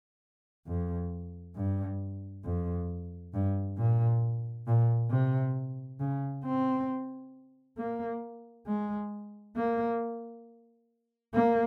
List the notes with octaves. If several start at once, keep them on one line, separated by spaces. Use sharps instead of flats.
F2
G2
F2
G2
A#2
A#2
C3
C#3
C4
A#3
G#3
A#3
A#3